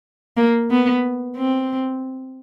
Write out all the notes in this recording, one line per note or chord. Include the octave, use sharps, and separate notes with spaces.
A#3
B3
C4